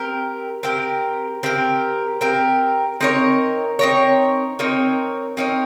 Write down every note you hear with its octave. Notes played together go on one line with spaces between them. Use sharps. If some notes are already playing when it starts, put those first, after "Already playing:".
Already playing: C4 G4 A#4
C4 G4 A#4
C4 G4 A#4
C4 G4 A#4
C4 D#4 A#4 C#5
C4 D#4 A#4 C#5
C4 D#4 A#4 C#5
C4 D#4 A#4 C#5